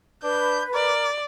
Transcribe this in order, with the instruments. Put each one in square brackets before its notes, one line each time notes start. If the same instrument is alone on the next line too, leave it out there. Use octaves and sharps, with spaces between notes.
[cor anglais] D4 [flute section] B4 [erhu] G6
[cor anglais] A#4 [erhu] D5